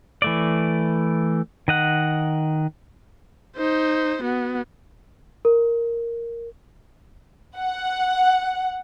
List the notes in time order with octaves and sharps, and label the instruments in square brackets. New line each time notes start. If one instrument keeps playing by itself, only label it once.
[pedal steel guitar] E3 A3 D5
D#3 D#5 F#5
[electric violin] D#4 C5
B3 F#4
[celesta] A#4
[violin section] F#5